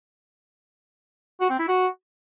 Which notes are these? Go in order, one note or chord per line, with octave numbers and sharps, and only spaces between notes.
F#4
C4
E4
F#4